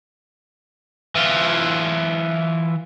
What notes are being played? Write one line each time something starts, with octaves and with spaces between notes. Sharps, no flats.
E3 F4